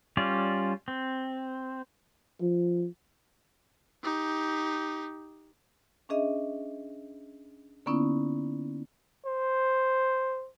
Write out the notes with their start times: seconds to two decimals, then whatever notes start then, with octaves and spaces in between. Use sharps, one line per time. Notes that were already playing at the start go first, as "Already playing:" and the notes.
0.17 G3 C#4 F4 D5
0.88 C4
2.41 F3
4.03 D#4 G4
6.09 C#4 D4 G#4 D#5 E5
7.86 D3 A#3 B3 C#4 D#4 E4
9.26 C5